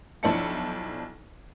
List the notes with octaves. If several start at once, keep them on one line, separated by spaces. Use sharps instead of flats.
B1 F3 D4 E4 A5 C#7